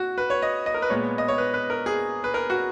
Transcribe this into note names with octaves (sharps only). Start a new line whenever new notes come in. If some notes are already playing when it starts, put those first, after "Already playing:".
Already playing: F#4
B4
C#5
D#5
D#5
A#4
B4
A#2 G#3 B3 C#5
D#5
C#5
B4
B4
A#4
G#4
B4
A#4
F#4